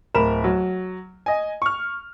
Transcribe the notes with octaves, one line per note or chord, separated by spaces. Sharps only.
D1 A#4 B5 E7
F#3
D#5 G#5
C#6 F6